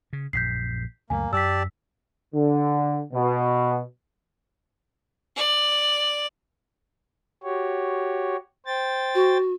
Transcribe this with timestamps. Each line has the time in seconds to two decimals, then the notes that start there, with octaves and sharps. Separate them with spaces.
0.13 C#3
0.33 A#1 F#2 G6 B6 C7
1.10 C#2 F#2 A3 A#3 G#5
1.33 F#2 G4 D5 A5 E6 B6
2.34 D3
3.13 B2
5.36 D5
7.44 F#4 G4 C#5
8.66 C5 G5 A6
9.15 F#4